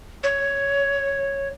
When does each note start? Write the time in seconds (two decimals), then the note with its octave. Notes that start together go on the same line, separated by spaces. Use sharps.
0.23 C#5